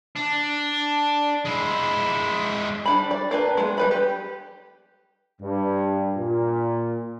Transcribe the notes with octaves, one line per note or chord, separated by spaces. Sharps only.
D4
G#3 E4
G3 D4 B5
D5
A#3 D4 B4
G#3 B3
G3 B4 B5
G4
G2
A#2